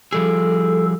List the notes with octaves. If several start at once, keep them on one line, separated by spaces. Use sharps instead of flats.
F3 G3 G#4 A4